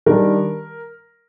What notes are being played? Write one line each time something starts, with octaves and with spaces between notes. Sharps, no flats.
D#3 G3 D4 A#4